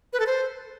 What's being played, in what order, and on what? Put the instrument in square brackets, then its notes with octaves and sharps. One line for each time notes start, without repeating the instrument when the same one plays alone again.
[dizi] B4
A4
C5